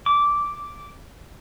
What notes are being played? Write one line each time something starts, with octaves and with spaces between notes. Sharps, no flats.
D6